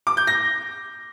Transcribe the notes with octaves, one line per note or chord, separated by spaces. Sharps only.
D6
G6
A#6